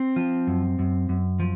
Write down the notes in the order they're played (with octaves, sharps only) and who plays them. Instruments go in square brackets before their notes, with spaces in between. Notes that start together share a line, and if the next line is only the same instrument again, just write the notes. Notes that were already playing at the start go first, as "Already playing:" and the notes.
Already playing: [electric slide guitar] C4
F3
F#2
F#2
F#2
F3